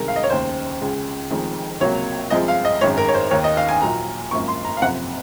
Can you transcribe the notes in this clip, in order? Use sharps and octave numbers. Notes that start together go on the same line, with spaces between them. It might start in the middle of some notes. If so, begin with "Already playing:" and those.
Already playing: C2 C3 D#3 G#3 A#4
F5
D#5
C#5
F1 D#2 C#3 C5
C#2 C#3 G#3
F1 F2 D#3 G#3
C#2 C3 F#3 A#3 C#5
C2 C3 F3 G#3 D#5
F5
D#5
G#1 F#2 D#3 G#3 C#5
A#4
C#5
C5
D#2 D#3 A#3 C#5
D#5
F5
G#5
A#1 A#2 F#3 A#3 A#5
G#1 F#2 F3 A#3 C#6
C6
A#5
F5
F#1 F2 C3 F#5